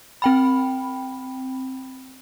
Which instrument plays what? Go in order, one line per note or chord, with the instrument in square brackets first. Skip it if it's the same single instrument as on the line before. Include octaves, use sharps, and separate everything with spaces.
[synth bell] C4 G5 B5